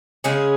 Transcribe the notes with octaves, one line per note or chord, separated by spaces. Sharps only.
C#3 G#3 C#4 G#4